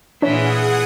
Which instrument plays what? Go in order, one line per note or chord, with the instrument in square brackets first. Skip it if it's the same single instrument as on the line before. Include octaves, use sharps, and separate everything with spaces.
[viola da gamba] A#2 E3 [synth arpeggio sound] D4 C#5 [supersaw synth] G#4 F#5 D#6